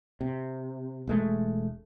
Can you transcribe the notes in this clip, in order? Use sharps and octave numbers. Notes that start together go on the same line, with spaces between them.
C3
E1 G#3 A3